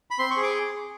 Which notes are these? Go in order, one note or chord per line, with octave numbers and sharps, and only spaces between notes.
B5
C4 C6
C#6
G#4
D6